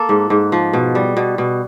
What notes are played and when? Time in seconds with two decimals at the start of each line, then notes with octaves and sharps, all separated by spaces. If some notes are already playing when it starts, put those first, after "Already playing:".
Already playing: A#3 A4
0.09 G#2
0.30 G#2
0.52 F3
0.73 B2
0.95 G3
1.17 B2
1.38 B2